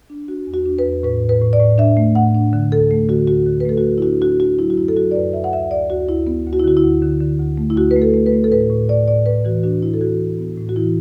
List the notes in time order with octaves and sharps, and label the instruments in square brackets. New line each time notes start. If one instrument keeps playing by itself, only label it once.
[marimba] D4
D4 F#4
E2
F#4
D4
B4
E2
A2 B4
A2
B4
A2
D5
A2
D4 E5
A3
A2 F#5
D4
D3
D2 A4
A3
D3 F#4
D2 F#4
D3
B4
A3 A4
F#4
D3
E4
D4 F#4
D4 F#4
D4 F#4
F#3 E4
F#4
F#2 E4
A4
F#3 F#4
D5
F#2 B4
F#2 E5
F#5
D2 E5
D2 D5
D2 F#4
D2 E4
B3
D2
F#4
E4
D3 F#4
E4
D2
D3
D3
D2
A3
E4
D2 F#4
B4
A3
A4
A3
B4
A3
A4
A2 B4
A2
A2 D5
A2 D5
A2 B4
E3 F#4
D4 F#4
A2 E4
A4
E3 F#4
A2
B3
A2
F#4
E3 E4